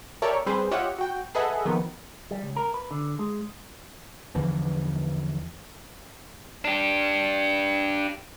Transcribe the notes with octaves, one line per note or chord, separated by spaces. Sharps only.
G4 A4 A#4 C#5 D5 E5
G3 C4 G#4 B4 C5
F4 G4 C#5 D#5 E5 F#5
F#4 G5
G#4 A4 B4 D#5 E5 F#5
D#3 F3 A#3 B3
G3
C#2
A#4
B4
D3
G#3
E2 D3 E3 F3
D4 G4